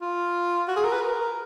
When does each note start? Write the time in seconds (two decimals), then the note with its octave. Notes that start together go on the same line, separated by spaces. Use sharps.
0.01 F4
0.68 F#4
0.76 G#4
0.84 A#4
0.93 B4
1.02 A#4